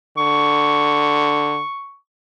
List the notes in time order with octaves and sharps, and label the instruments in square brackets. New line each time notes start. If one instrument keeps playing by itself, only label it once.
[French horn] D3 [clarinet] C#6